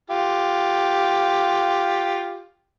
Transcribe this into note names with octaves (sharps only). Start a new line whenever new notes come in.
F4 G4